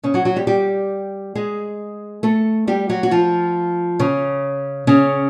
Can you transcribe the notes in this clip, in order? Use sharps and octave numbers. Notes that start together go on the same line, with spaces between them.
C#3 C#4
F#3 F#4
F#3 F#4
G3 G4
G3 G4
G#3 G#4
A3 A4
G3 G4
F#3 F#4
F#4
F3 F4
C#3 C#4
C#3 C#4